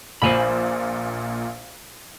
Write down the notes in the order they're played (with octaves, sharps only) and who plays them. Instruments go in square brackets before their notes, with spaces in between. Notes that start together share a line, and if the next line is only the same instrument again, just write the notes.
[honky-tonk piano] A#1 A#2 [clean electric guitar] C5 G#5 B5